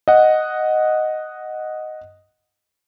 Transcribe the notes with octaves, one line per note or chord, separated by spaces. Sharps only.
D#5 F#5